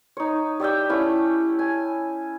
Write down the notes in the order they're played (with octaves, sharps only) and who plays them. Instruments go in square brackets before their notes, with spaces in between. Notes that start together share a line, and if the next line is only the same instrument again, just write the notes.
[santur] D#4 C#5
G4 D5 E5 G5
A3 C#4 E4
G#5